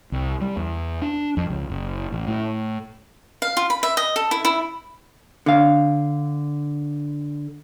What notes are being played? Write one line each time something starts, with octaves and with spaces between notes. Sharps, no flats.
C2
G3
E2
D4
F2
C#2
F#1
A1
A2
F5
F4
B5
E5
D#5
A4
E4
E4
D3 F5